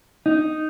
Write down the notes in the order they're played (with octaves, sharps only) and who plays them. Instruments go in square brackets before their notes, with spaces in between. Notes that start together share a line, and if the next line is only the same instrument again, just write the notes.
[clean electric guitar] D#4